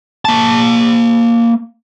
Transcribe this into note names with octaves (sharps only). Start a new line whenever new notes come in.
A#3 A5